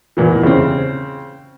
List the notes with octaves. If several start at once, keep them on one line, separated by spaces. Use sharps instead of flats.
E2 A#2 E3
C#3 C4